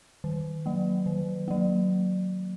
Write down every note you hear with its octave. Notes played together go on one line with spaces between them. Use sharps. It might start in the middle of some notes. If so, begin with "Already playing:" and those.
D#3
F#3 A#3
D#3
F#3 A#3